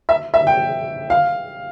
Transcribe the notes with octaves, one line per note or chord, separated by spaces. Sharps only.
E5
E5
G5
F5